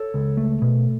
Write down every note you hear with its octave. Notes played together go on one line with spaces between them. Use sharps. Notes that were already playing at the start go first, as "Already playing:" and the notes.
Already playing: A4 C#5
C#2
A3
B2